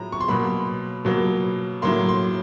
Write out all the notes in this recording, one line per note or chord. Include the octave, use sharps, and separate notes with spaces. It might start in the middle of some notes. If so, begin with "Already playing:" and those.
Already playing: A2 F#3 A#5
C#6
C6
B2 F#3 A#3 B5
B2 F#3 A#3
A2 F#3 A#3 C6
C6